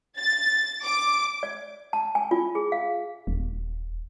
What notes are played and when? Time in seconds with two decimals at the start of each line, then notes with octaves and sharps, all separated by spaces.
0.18 A6
0.84 D6
1.43 D5
1.93 A5
2.15 G#5
2.31 F4
2.55 G#4
2.72 F5
3.27 D#1